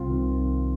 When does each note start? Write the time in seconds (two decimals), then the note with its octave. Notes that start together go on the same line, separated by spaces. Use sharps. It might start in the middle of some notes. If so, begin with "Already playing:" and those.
Already playing: C2 C4 F4
0.10 D#3